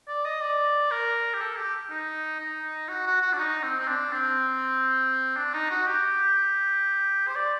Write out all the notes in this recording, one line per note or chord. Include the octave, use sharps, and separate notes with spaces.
D5
D#5
D5
A#4
G4
A4
G4
D#4
D#4
F#4
F#4
F#4
D4
D#4
C4
C4
D4
C4
D4
D#4
F#4
G4
C5
D5